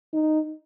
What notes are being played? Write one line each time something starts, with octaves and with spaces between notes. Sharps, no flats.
D#4